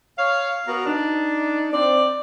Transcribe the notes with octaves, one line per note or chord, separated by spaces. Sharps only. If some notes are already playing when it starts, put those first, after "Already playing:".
C#5 F5
B3 F#4 A#4
D4 D#4
C4 D5